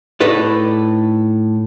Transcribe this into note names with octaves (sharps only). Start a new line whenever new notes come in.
A2 D#4 A4 B4 D5